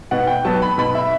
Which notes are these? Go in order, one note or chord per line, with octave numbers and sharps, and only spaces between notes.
B2 F#5
G5
F#3 B3 A5
B5
B2 B5
E5